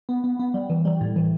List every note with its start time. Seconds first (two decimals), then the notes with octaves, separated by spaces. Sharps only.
0.09 B3
0.24 B3
0.39 B3
0.54 G3
0.70 E3
0.85 G3
1.01 A2
1.16 E3